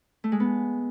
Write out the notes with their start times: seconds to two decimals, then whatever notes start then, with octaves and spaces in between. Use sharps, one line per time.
0.24 A3
0.32 G#3
0.40 B3